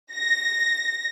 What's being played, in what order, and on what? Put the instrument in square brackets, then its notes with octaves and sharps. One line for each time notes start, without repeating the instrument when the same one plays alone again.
[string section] A#6